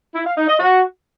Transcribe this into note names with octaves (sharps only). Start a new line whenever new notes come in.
E4
F5
D#4
D#5
F#4